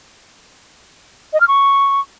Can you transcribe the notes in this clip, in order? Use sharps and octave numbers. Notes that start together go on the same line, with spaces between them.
D#5
F6
C#6